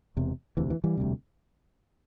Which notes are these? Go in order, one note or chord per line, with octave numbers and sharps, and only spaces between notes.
E1 E2 C3
E1 D2 C3 E3
E3
E3 G3
E1 D2 C3